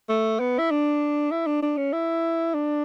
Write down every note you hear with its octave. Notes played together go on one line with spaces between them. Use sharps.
A3
B3
E4
D4
E4
D4
D4
C#4
E4
D4